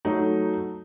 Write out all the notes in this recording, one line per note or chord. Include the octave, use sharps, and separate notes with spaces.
F#3 A3 D#4